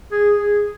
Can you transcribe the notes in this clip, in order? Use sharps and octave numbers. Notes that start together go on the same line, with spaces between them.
G#4
G#4